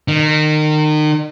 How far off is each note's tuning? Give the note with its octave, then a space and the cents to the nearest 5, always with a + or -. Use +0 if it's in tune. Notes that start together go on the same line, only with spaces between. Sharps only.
D#3 -30